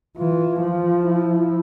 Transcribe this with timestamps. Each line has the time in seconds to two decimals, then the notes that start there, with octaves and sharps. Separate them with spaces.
0.17 E3 F4
0.61 F3 F4
1.04 E4